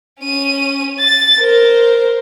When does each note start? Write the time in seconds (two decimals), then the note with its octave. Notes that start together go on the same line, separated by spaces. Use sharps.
0.20 C#4 D#7
0.99 A6
1.39 A#4 C5